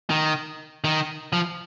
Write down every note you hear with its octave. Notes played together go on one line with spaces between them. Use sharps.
D#3
D#3
F3